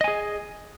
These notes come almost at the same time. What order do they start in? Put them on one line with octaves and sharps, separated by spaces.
D#5 G#5 G#4